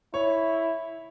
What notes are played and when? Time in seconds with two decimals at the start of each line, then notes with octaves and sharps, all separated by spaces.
0.14 E4 C#5